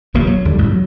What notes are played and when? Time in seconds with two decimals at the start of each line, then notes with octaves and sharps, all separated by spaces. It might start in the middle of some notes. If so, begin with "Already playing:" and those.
0.14 D#1 A#1 C3 A#3
0.27 F#3
0.45 D#2 D3 G3
0.58 A1 G#2
0.72 F#3